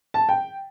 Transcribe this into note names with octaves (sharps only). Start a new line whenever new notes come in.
A5
G5